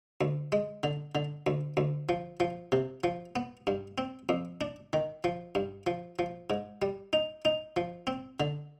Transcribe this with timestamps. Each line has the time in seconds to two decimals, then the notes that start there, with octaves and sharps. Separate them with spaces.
0.21 D2
0.52 G#3
0.83 D3
1.15 D3
1.47 D2
1.77 D2
2.09 F3
2.40 F3
2.72 C3
3.04 F3
3.36 B3
3.67 G2
3.98 C4
4.29 F2
4.61 D4
4.93 D#3
5.24 F3
5.55 G2
5.87 F3
6.19 F3
6.50 G#2
6.82 G3
7.13 D#4
7.45 D#4
7.76 F3
8.07 C4
8.40 D3